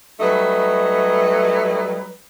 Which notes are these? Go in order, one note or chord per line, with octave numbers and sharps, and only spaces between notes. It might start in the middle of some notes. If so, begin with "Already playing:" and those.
F#3 G3 A3 D#4 B4 D#5